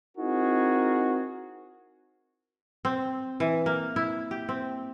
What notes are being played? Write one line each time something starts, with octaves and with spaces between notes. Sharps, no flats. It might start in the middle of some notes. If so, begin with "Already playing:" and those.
C4 D#4 E4 F#4 G#4 A#4
C4
E3
A#3
E4
G4
C4